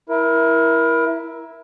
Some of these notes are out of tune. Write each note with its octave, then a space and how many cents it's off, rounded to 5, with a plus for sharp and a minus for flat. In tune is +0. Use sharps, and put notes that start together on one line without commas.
E4 +0 A#4 +25